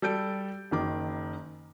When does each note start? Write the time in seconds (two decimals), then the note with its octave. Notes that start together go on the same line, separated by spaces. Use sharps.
0.02 G3 A4 G6 D7
0.71 F#1 D#3 D6